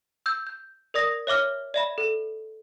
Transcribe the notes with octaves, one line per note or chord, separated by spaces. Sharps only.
E6 G6
G6
A#4 D5 D#6 A#6
C#5 E5 D6 F6
D5 E5 B5
A4